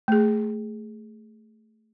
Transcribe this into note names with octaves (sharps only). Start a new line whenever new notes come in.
A3 G#4